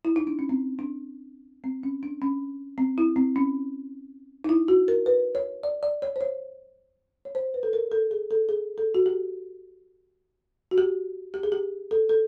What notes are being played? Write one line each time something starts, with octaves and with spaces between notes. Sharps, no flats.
E4
D#4
D4
C#4
C4
D4
C4
C#4
D4
C#4
C4
E4
C4
C#4
D#4
E4
F#4
A#4
B4
C#5
D5
D5
C#5
C5
C#5
C#5
C5
B4
A4
A#4
A4
G#4
A4
G#4
A4
F#4
G4
F#4
G4
G4
G#4
G4
A4
A4